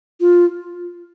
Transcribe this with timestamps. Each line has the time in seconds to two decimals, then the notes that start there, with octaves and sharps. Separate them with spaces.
0.21 F4